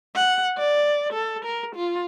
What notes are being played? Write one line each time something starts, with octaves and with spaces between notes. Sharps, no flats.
F#5
D5
A4
A#4
F4